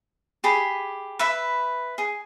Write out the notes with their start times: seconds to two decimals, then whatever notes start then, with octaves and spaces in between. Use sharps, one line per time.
0.44 G4 G#4 B5
1.19 B4 E5 B5
1.98 G#4